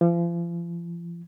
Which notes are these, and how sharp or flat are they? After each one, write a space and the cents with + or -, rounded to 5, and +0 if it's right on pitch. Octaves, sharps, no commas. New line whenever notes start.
F3 -40